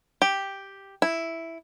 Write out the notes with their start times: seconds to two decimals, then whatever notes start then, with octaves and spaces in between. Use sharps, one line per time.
0.22 G4
1.02 E4